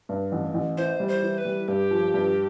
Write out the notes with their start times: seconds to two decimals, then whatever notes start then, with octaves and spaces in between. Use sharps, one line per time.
0.09 G2
0.32 A1
0.54 A1
0.77 E3 C5
1.00 G3
1.08 C5
1.22 E3
1.38 B4
1.45 G3
1.68 G2 G4
1.91 F3
2.14 G2